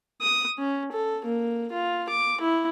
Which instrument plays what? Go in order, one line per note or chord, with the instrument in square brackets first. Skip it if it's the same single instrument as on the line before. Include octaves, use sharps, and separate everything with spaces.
[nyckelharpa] D#6
C#4
A4
A#3
F4
D6
E4